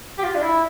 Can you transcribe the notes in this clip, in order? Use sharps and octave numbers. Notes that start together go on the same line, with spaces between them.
G4
F4
D4
E4